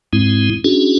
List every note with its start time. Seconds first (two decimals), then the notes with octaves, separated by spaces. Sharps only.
0.13 G#2 G#3 C4 E4
0.64 C#4 D4 E4 F#4 G#4